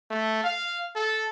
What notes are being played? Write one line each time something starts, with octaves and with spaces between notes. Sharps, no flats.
A3
F5
A4